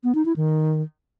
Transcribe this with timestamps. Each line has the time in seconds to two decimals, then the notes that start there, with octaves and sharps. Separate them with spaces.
0.04 B3
0.15 D#4
0.26 E4
0.36 D#3